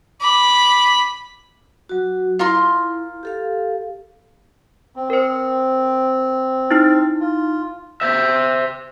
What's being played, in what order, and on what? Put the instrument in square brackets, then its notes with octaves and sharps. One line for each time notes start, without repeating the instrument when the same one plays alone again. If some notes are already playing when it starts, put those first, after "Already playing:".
[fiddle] B5 [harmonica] D6
[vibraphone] F#3 F#4
[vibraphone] E4 [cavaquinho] F4 A#4 C6
[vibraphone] G4 A4 F5
[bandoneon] C4
[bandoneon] C4 [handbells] A#4 C5
[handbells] D#4 E4
[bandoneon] F4
[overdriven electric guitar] C5 E5